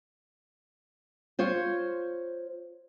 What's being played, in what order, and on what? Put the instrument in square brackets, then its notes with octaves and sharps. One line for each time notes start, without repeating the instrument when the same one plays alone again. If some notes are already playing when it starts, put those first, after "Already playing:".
[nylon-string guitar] F4 C5 C#5